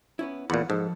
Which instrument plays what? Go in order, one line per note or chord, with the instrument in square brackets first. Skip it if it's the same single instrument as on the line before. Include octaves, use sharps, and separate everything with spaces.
[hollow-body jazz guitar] B3 C#4 E4
[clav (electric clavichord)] E2 A#2 [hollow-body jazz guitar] E3 F#5 B5
[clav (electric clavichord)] G#2 [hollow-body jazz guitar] F3 A4